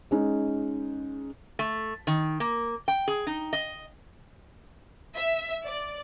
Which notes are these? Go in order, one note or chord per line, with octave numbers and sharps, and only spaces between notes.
G#3 C#4 D#4
A3
D#3
A#3
G5
G#4
D#4
D#5
E5
D5